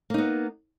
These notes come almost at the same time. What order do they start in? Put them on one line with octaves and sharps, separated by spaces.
A#3 D#4 B3